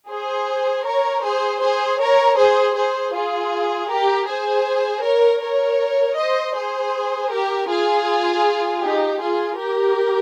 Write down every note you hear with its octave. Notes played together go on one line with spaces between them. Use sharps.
G#4 C5
A#4 C#5
G#4 C5
G#4 C5
A#4 C#5
G#4 C5
G#4 C5
F4 G#4
G4 A#4
G#4 C5
A#4 C#5
A#4 C#5
C5 D#5
G#4 C5
G4 A#4
F4 G#4
D#4 G4
F4 G#4
G4 A#4